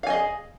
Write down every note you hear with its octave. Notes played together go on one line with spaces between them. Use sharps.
G#4 D#5 F5 G#5